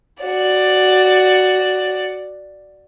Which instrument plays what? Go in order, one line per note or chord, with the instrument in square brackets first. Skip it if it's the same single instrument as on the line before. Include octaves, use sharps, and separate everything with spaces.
[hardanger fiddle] F#4 D5